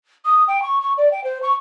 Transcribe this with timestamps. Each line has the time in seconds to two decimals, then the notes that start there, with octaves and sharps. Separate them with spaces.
0.25 D#6
0.47 G5
0.62 C#6
0.81 C#6
0.97 D5
1.11 G5
1.24 C5
1.42 C#6